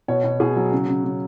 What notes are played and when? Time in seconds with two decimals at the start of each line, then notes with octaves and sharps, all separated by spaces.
0.08 B2 C#5
0.24 B2
0.40 B2 G#4
0.56 F#3
0.72 C#3
0.88 C#3
1.04 C#3